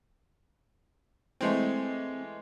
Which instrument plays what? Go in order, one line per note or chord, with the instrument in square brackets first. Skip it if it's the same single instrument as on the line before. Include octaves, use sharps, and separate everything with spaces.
[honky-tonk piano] E3 G#3 A3 [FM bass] C4